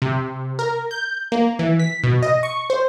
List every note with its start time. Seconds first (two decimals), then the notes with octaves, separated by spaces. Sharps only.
0.02 C3
0.59 A#4
0.91 G6
1.32 A#3
1.59 E3
1.79 B6
2.04 B2
2.23 D#5
2.43 C#6
2.70 C5